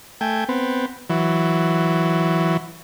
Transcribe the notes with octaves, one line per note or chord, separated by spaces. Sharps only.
A3 G5 G#5
B3 C4
E3 F#3